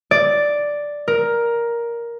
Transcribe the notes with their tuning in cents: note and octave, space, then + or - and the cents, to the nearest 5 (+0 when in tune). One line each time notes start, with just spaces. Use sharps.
D5 +0
A#4 +10